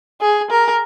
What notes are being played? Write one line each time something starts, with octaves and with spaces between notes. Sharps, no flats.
G#4
A#4